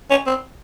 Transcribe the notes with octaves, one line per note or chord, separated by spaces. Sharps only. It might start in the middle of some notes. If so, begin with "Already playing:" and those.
C#4
C4